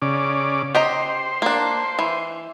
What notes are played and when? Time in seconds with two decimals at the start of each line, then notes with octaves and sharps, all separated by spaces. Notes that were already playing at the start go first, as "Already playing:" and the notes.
0.02 C#3 D5
0.75 G4 C5 D#5 A#5
1.42 A#3 D4
1.99 E3